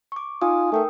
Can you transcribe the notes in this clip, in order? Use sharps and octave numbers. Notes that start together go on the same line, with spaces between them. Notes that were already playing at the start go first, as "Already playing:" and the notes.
C#6 D6
D#4 F4 G#5 D#6
A3 A#4 G5 D#6